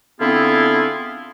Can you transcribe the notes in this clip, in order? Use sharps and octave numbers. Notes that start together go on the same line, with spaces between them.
D3 B3 C4 E4 F4 G#4